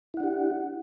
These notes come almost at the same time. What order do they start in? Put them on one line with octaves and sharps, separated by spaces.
E4 F#5 D4 G4